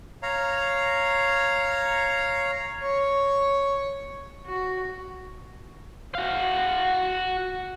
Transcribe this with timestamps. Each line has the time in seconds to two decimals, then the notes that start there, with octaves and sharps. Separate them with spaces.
0.23 C#5 F5 A#5
2.82 C#5
4.47 F#4
6.15 F#4 F5